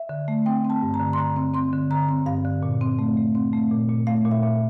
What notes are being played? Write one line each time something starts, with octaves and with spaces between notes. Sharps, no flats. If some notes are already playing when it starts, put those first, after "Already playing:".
Already playing: E5
D3
A3
C4 G5
C4
A5
G2
A#5
D3
C6
D3 A#5
C4
C4 C6
D3
D3 A#5
C4
G2 F5
D3
A#2
C4
A3
A3
C4
A3
A#2
A#2
A3 F5
A#2
E5
A#2